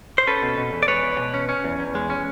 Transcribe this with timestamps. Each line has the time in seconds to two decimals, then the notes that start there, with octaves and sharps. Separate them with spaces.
0.18 C5
0.27 C#4 A4 B4
0.42 B2
0.58 B2
0.73 E2
0.83 D5
0.88 G#3 B4 C#5
1.03 E2
1.18 B2
1.34 C#4
1.49 C#4
1.64 E2
1.79 E2
1.95 G#3
2.10 C#4